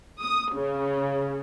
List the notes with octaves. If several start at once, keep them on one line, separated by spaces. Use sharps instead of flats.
D#6
C#3